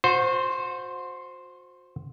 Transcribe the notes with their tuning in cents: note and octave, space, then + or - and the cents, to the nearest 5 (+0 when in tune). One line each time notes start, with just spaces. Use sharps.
F#4 -35 C5 +0